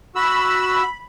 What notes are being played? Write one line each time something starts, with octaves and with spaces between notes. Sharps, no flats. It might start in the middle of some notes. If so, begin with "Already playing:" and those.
F#4 B5 E6